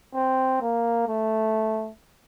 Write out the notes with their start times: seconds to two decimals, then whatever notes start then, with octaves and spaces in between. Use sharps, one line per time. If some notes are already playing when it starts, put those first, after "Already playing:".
0.15 C4
0.61 A#3
1.08 A3